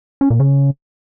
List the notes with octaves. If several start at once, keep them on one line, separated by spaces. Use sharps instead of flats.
C#4
A#2
C#3